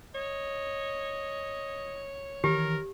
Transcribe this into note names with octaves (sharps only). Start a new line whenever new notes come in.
C#5 D#5
D#3 E3 G4 A#4